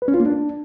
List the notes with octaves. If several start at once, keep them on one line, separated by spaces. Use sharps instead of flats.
B4
C#4
F4
A#3
D4